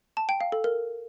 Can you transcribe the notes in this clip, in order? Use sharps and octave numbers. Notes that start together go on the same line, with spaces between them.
A5
G5
F5
A4
A#4